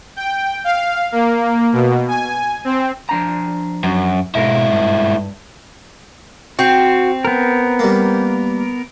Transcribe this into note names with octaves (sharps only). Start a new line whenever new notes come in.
G5
F5
A#3
B2
G#5
C4
F3 D4 A#5
F#2
G#2 B2 E4 A#4 F5
G2
C4 F#4 C#6
B3 A#4
G3 A#3